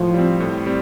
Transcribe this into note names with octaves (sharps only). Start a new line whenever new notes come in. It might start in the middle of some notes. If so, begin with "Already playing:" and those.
Already playing: A2 F3
G3 C4
A2
G3 C4